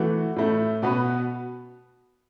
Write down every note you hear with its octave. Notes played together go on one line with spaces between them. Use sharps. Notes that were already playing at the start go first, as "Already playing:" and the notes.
Already playing: E3 A3 F#4
A2 A3 E4
B2 B3 F#4 B4